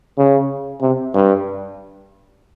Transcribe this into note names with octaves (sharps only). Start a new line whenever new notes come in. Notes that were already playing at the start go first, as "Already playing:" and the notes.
C#3
C3
G2